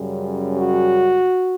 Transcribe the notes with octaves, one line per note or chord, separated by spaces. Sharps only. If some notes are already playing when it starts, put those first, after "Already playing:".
Already playing: F#2 C#3 G3
F#4